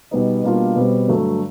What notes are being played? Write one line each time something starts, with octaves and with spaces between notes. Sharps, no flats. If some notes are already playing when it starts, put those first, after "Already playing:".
B2 G3 B3 D#4
B2 G3 A#3 D4 F4
B2 G3 C4
G2 D3 F#3 A3